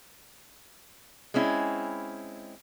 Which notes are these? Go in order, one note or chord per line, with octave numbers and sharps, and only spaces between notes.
G#3 C4 C#4 E4